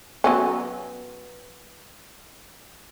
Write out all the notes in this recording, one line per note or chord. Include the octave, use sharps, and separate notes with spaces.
F#3 B3 C#4